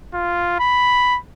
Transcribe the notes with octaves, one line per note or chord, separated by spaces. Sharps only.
F4
B5